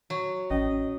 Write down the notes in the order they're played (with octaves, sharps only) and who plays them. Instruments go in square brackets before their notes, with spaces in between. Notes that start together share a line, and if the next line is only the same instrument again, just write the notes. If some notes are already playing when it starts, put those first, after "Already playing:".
[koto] F#3
[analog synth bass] A1 [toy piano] C#4 [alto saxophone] D#5